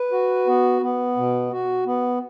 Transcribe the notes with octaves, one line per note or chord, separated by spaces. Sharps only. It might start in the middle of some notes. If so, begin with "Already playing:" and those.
Already playing: B4
F#4
B3
B3
B2
F#4
B3